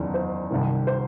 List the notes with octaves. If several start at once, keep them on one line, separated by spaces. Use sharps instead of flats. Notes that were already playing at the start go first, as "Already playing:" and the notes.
Already playing: F#1 E2 D#3
C5
C2 C3 D#3
C5